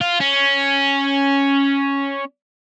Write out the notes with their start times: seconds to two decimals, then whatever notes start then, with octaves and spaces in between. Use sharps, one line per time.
0.01 F4
0.21 C#4